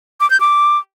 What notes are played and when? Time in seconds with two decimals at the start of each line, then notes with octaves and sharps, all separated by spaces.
0.20 D6
0.30 G6
0.40 D6